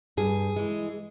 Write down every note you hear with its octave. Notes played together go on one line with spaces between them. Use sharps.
G2 G#4
E3 G#3